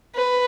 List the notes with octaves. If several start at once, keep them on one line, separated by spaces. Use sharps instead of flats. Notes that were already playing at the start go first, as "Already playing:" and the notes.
B4